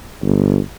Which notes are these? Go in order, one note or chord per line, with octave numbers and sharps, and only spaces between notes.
G1